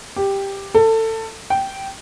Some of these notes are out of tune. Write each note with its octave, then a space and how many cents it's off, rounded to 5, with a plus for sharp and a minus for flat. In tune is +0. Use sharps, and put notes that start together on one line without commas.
G4 +5
A4 +25
G5 -10